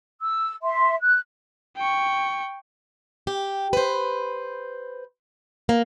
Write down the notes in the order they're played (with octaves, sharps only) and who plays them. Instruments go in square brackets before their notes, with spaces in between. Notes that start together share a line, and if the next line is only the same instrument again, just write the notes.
[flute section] E6
E5 C6
F#6
[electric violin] G5 C#6
[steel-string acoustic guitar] G4
B4 C5
A#3